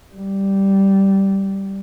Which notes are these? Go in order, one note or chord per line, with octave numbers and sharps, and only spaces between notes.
G3